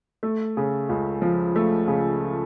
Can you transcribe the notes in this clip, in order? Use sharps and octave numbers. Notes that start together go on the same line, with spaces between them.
A3
C#3
C#2
F3
A3
C#3